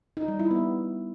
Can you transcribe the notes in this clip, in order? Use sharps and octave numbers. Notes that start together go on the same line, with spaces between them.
D#4
G3
E4
B3